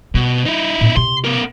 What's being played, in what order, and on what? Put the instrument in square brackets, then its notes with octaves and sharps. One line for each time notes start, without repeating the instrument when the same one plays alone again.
[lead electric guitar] B2 [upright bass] G3
[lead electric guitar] D#4 E4
[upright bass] A2 B3
[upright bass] C3 [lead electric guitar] C6
[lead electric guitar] B3 A#4